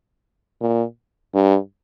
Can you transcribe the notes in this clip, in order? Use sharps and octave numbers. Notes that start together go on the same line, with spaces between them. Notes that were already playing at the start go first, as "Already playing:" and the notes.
A#2
G2